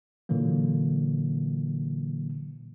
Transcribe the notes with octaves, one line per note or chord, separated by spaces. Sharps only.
A#2 D3 E3 F#3 A#3